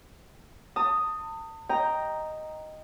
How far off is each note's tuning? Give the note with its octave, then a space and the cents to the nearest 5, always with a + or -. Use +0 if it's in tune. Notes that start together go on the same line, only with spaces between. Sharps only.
A5 +40 D#6 +0
D#5 +0 G5 +0 A#5 +0